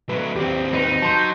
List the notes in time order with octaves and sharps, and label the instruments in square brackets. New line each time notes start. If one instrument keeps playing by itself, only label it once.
[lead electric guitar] F#3 A3 [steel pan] B4
[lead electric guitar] D#2 C4 [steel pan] G4
[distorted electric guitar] D#4 [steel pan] B4
[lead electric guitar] F#3 [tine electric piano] A5 C6 G6